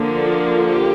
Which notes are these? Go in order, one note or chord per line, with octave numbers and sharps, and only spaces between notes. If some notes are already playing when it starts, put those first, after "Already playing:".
Already playing: D3 F3 A#3
F4
G4